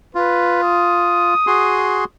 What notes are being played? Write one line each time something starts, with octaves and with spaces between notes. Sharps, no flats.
F4 B4
D#6
F#4 G#4 C6